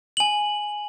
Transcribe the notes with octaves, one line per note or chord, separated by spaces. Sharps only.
G#5 F#7